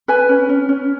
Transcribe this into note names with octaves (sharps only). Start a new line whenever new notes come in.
B4 G#5
C#4
C#4
C#4